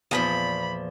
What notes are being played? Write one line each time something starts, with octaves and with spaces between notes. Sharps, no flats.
E2 A#2 F3 B5